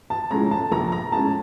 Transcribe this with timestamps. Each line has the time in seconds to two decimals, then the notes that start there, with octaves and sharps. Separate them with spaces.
0.10 A5
0.30 A2 F3 G#3 C#4 A#5
0.51 A5
0.72 A#1 A#5
0.92 A#5
1.12 A2 F3 G#3 C#4 A5